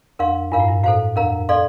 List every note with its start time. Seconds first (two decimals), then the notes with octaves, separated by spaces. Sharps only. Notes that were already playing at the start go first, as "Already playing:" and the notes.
0.19 F2 A#4 F5 C6
0.52 G2 F4 A#4 F5
0.60 A2
0.68 G2
0.84 A2 A4 C5 F5
1.16 F2 A#4 F5 A#5
1.49 A4 D5 F5 C6